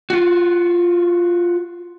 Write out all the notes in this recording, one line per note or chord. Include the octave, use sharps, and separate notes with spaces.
F4 F#4